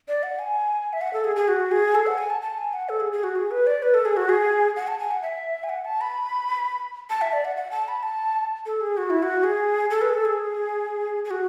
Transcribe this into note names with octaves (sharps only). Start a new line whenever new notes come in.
D5
F#5
G#5
E5
F#5
A4
G#4
G#4
F#4
G#4
A4
F#5
G#5
A5
A5
G#5
F#5
A4
G#4
G#4
F#4
G#4
B4
D5
B4
A4
G#4
F#4
G#4
F#5
A5
G#5
F#5
E5
G#5
F#5
A5
B5
A5
E5
D5
F#5
F#5
A5
B5
A5
A4
G#4
F#4
E4
F#4
G#4
A4
B4
G#4
A4
G#4
G#4
F#4